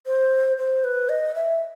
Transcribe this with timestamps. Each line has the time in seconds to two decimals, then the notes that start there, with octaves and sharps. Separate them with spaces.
0.07 C5
0.58 C5
0.84 B4
1.09 D#5
1.35 E5